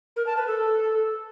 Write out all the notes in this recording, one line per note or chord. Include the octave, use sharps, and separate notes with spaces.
A#4
A5
B4
A4